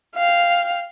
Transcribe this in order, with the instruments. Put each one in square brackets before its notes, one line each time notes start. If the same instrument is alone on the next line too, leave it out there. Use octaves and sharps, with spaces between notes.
[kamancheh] F5 G5